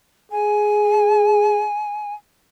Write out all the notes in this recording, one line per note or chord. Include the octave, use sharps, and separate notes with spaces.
G#4 G#5